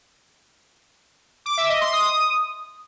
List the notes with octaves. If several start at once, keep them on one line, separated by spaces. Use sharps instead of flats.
D6
E5
D#5
C6
D#6